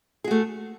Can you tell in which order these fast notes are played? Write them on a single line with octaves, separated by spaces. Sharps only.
G#4 F#4 A3